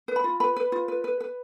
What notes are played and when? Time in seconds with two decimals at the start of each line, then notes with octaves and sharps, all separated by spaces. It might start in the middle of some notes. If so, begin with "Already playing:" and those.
0.08 B4
0.16 B5
0.24 F4
0.40 B4 B5
0.56 B4
0.72 F4
0.88 B4
1.04 B4
1.20 B4